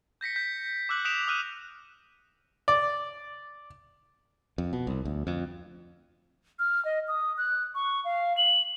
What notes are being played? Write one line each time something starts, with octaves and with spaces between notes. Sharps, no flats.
G6 A#6 B6 C#7
G6 B6
D6 E6 F#6 F#7
D#6 F#6 B6 D7 E7 F7
D#6 F6 F#6 D#7
D5
F2
B2
C2
D2
F2
F6
D#5
D#6
F#6
C#6
F5
F#7